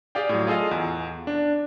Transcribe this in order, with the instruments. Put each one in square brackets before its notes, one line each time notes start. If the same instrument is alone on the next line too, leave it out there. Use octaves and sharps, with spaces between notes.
[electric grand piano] G4 G#4 D5 F5 G5
A2 F#3
F4 G#4 A4 D#5 F5
E2
D4